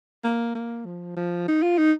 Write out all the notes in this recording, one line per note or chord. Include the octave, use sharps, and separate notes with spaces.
A#3
A#3
F3
F3
D#4
F4
D#4